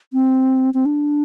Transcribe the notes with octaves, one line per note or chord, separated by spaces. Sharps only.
C4
C4
D4